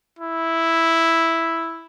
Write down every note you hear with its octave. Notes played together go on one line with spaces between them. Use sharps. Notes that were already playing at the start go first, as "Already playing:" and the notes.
E4